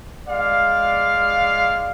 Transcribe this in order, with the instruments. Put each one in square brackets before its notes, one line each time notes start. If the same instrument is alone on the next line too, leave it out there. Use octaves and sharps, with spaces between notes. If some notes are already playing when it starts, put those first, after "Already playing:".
[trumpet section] G#3 D5 F5